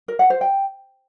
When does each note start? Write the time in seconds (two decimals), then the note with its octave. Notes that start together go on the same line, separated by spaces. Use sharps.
0.08 A#4
0.19 F#5
0.30 C5
0.41 G5